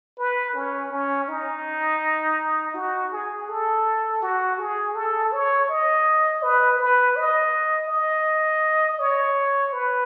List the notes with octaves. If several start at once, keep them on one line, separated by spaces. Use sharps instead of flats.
B4
C#4
C#4
D#4
F#4
G#4
A4
F#4
G#4
A4
C#5
D#5
B4
B4
D#5
D#5
C#5
B4